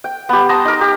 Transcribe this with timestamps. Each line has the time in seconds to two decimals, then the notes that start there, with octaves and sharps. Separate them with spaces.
0.04 G5
0.29 B3 G4
0.49 A5 A#5 C6 D#6
0.65 D#4 A#4
0.81 G4